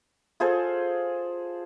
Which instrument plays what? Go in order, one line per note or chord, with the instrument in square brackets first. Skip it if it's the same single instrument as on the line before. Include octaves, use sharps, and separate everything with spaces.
[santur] F4 G#4 A4 C5